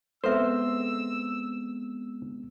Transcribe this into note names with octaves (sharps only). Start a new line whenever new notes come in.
G#3 B3 C4 A4 B4 C5 E5 E6